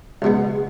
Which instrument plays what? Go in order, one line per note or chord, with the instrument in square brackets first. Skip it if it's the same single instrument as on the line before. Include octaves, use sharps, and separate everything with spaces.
[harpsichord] C#2 B2 G#3 B3